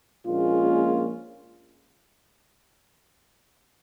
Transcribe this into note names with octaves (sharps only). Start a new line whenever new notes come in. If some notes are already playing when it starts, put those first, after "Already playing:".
A#1 A#2 G#3 C#4 F4